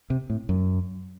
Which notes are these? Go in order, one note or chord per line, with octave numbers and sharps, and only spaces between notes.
C3
A2
F#2